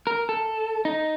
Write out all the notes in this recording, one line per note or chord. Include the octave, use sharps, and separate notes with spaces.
A#4
A4
D#4